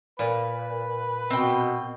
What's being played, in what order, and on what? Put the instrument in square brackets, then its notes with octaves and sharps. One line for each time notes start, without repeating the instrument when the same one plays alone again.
[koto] A#2 [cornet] B4
[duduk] B2 [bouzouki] C4 G5